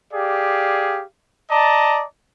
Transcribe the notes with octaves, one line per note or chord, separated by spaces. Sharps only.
G4 G#4 D5 F5
D5 D#5 A5 A#5